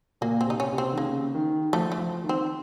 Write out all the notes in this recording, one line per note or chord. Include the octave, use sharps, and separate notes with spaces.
A#2 A#3
C4
C3 D#4
C#4
C3
C4
D#3
C#3 A#3
D#3
F3 A3
A3
F3
D#3
C4